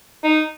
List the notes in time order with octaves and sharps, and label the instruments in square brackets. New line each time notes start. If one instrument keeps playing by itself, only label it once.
[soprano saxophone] D#4